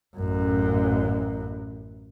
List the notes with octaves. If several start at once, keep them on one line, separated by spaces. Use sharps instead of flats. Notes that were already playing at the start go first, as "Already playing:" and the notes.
A1 F#2